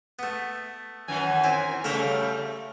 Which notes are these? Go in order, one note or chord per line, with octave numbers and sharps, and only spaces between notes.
A3 B3
F#2 D#3 E3 G#5
C4 E4
C#3 G3 A3 A#4 E5 F5